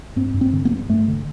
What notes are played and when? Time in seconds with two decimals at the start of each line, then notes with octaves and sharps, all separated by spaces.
0.16 G2 C4
0.34 G2
0.41 C4
0.53 D3
0.65 B3
0.71 G2
0.89 G2 A3
1.08 D3